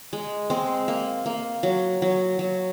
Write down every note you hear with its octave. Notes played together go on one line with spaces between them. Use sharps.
G#3
G#3 C4
A#3
A#3
F#3
F#3
F#3